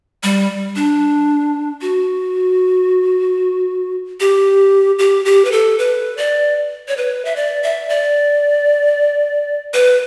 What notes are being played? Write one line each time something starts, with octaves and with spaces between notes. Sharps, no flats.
G3
D4
F#4
G4
G4
G4
B4
A4
B4
D5
C#5
B4
E5
D5
E5
D5
B4